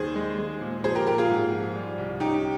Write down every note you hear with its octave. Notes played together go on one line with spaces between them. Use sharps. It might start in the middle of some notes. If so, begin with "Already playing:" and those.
Already playing: D#2 D#3 G3 G#4 C5
G#3
G#3
A#2
F3 G#4 C5
G4 A#4
A#2 G4 A#4
F4 G#4
G#2
F3
G3
C2
C#4 D#4 G4